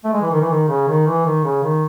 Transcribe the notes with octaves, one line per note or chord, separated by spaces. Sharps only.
A3
G#3
E3
D#3
E3
D#3
C#3
D#3
E3
D#3
C#3
D#3